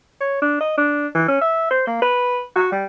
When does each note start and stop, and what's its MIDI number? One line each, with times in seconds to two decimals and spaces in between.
0.21 0.37 73
0.42 0.59 62
0.61 0.74 75
0.78 1.08 62
1.15 1.26 52
1.28 1.37 61
1.41 1.69 76
1.70 1.85 72
1.87 1.98 58
2.02 2.43 71
2.56 2.69 66
2.72 2.85 55